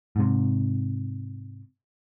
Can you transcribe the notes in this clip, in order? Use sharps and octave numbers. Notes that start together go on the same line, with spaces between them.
G#2 C3